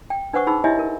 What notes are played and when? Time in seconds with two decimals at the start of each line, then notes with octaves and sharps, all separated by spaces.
0.10 G5
0.33 D4 B4 C5 F#5 C#6 D#6
0.47 D#4 G#4 B5 E6
0.64 E4 G4 C#5 D#5 E5 G#5
0.79 A#4